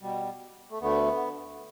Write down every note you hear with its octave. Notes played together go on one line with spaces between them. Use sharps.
B2 G3
A3
D2 D3 A3 B3